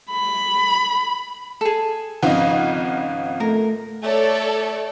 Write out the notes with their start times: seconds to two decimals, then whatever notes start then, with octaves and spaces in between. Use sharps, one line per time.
0.12 B5
1.61 G#4 A4
2.23 G#1 C#3 F3 D#5 F5 F#5
3.40 A3 A#4
4.03 A3 A4 C#5 D5